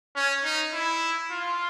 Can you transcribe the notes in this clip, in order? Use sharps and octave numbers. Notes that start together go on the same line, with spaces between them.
C#4
D#4
E4
F4